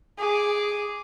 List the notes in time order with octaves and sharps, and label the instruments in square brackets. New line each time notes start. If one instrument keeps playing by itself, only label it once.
[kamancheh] G#4 D6